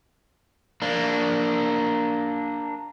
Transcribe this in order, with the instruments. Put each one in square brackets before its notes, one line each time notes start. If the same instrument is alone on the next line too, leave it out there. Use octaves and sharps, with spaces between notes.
[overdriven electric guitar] A#3 D4